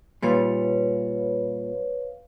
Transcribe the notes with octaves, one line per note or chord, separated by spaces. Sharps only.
A#2 G3 B4 C#5 F5